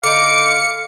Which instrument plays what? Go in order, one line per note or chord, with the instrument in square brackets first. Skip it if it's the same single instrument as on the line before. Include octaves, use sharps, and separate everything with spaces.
[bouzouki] D3 D#4 [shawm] F5 [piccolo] D6 [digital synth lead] C#7